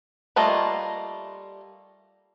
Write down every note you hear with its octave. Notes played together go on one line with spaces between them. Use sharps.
G3 A3 A#3 F4 D#5